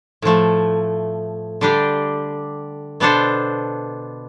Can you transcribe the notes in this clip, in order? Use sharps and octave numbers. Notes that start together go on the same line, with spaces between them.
A2 F3 A3
D3 G3 D4 G4
B2 B3 D4 A4 C5